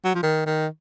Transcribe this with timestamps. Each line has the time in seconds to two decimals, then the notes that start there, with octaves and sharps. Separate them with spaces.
0.05 F#3
0.15 F3
0.23 D#3
0.46 D#3